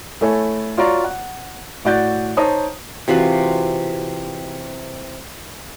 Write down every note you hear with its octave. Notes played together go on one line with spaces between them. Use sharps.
A3 E4 A4 C#5 G#5
F4 F#4 C#5 D5 A#5 C#6
F#5
A2 F#4 D5 F#5 G6 A6
D#4 C5 C#5 A5 A#5 D#6
C3 E3 F4 F#4